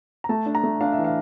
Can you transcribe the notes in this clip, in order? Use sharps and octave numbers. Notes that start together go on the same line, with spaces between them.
A#5
A3 A5
D4
A#5
A3
D4 F5
E5
E3
F5